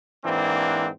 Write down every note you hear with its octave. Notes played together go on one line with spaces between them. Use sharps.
G#2 E3 A#3 C4 D4